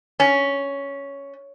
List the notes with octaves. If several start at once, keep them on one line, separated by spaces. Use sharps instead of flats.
C#4